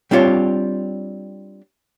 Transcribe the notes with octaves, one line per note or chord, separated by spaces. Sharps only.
G3 C4 D4 F4 C#5